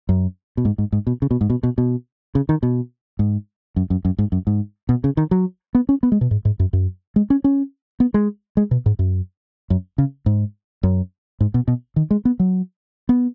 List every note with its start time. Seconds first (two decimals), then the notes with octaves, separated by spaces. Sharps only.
0.09 F#2
0.57 B2
0.65 G#2
0.78 G#2
0.92 G#2
1.07 B2
1.22 C#3
1.31 B2
1.41 G#2
1.50 B2
1.63 B2
1.78 B2
2.35 C#3
2.49 D#3
2.63 B2
3.19 G#2
3.76 F#2
3.90 F#2
4.05 F#2
4.18 G#2
4.32 F#2
4.47 G#2
4.89 B2
5.04 C#3
5.17 D#3
5.31 F#3
5.75 B3
5.89 C#4
6.03 B3
6.12 G#3
6.21 B2
6.31 G#2
6.45 G#2
6.60 F#2
6.73 F#2
7.16 G#3
7.30 C#4
7.44 C#4
8.00 B3
8.14 G#3
8.57 G#3
8.71 B2
8.86 G#2
8.99 F#2
9.70 F#2
9.98 C#3
10.26 G#2
10.83 F#2
11.40 G#2
11.54 B2
11.68 B2
11.96 D#3
12.11 G#3
12.25 B3
12.39 F#3
13.09 B3